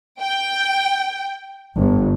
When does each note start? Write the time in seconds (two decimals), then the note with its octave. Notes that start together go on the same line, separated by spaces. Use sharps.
0.20 G5
1.75 G1